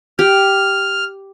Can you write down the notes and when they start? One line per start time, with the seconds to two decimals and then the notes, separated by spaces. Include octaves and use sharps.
0.19 G4 F6